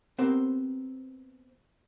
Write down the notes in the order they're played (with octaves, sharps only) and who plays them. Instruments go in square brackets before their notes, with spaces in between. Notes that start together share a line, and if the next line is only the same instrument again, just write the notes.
[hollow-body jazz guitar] B3 C4 G4 A#4 C5